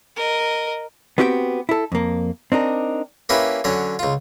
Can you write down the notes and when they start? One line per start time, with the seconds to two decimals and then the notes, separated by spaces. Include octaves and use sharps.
0.16 A#4 D#5
1.18 B3 C4 F#4 G4 E5 G5
1.69 E4 A4
1.92 F2 A#3
2.52 C4 D4 D#4 A#4
3.29 A#3 C#4 E4 G4 B4
3.64 D3 F#3 C#4
3.99 C#2 F4